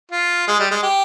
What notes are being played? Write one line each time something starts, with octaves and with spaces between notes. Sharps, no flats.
F4
G#3
G3
G#3
G4